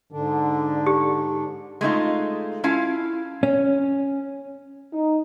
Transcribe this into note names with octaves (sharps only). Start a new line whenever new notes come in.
G#2 D3 D4
G4
G#3 A3 D#4 F4
C#4 E4 F4 F5 A5
C#4
D#4